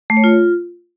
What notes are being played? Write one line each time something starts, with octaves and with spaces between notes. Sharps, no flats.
A3
C#5
F4